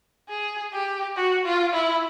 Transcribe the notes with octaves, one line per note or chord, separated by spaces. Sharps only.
G#4
G4
F#4
F4
E4